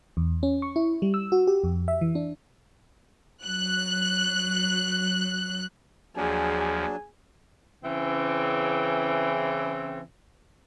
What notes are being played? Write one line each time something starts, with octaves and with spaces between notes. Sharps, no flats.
E2
C#4
C#6
E4
G3
E6
F#4
G4
F2
E5
E3
D4
F#3 F#6
D#2 F3 F#3 D4 G#4 G#5
C#3 E3 C4